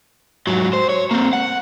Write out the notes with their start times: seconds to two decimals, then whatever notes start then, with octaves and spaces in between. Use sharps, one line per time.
0.47 G#2 F#3
0.73 C5
0.89 C#5
1.11 A#3 C4
1.33 F#5